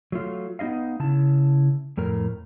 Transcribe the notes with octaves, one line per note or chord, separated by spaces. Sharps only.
F#3 A3 F4
B3 D#4 E4 D#5 F5
C#3 E4 A5
F2 A2 A#4